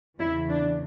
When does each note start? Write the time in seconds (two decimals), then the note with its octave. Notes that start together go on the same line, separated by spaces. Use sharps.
0.19 E2 C#3 E3 E4
0.49 D4